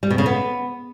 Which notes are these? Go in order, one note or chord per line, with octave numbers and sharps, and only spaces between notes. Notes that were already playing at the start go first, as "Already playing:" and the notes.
G3
B2
C#3
B3